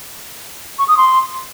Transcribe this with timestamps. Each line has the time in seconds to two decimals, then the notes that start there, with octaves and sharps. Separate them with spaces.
0.79 C#6
0.88 D#6
0.97 C6